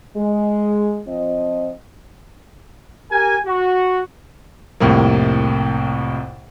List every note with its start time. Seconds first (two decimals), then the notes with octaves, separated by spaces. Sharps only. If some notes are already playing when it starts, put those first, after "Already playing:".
0.17 G#3
1.07 F3 C4 D#5
3.11 G4 A#4 G#5
3.45 F#4
4.80 C2 F2 A2 C3 A#3